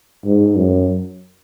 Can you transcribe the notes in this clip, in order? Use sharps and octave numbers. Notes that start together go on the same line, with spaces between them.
G#2
F#2